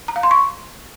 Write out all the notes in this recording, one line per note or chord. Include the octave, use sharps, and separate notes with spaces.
A#5
F5
C6
C#6